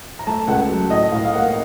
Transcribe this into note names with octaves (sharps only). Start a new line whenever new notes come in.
A#5
A3 A5
C#2 F#5
F#3
A2 D#5
A2 F5
F5
A#3 F#5